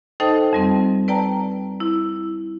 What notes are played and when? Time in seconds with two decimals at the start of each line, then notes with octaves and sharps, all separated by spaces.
0.20 D#4 A4 C5 D#5 G5 A5
0.53 F2 G3 C4
1.08 B4 D5 G5 A5 A#5
1.80 E4